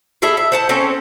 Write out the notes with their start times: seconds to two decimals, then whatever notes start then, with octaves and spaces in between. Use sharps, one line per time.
0.22 E4 G#4 A4 E5
0.37 E5
0.52 C5 F#5 A5
0.69 C4 C#4 A4 C5